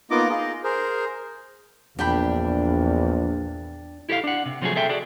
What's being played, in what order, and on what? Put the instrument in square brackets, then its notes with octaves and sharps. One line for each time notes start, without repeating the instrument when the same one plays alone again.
[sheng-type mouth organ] A#3 B3 D#4 F4 D#5 D6
D#4 F4 G#4 D#5
G#4 A#4 C5
[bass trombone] A#1 [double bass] E2 [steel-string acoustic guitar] D4 [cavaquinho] G4 G5 B5
[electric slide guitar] E4 G4 A4 D5 F5
D4 F#5
C3
C3 F3 F#3 A3 F4 G#4
G#4 A4 E5 G5
F#4 G#4 A4 D5